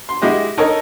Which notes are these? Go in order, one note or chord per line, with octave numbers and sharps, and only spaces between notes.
C6
G#3 E4 F#4 G4 D#5
D#4 A4 A#4 C#5 D#5